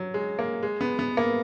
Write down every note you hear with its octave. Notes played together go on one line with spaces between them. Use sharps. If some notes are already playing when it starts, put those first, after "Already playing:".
Already playing: F#3
G#3
A#3
G#3
B3
B3
A#3